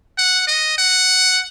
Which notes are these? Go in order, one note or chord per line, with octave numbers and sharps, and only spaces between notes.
F#5
D#5
F#5